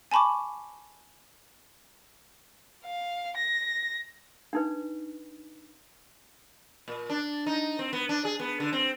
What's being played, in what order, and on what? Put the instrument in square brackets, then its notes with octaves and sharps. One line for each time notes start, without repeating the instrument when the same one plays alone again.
[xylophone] G#5 A5 B5 C#6 D6
[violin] F5
A#6
[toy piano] D4 D#4 B4
[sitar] A#2
D4
D#4
C4
B3
D4
G#4
B3
D3
C4